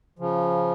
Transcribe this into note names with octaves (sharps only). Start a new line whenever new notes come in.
C#3 F3